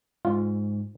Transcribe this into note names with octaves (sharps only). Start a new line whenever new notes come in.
G#2 F4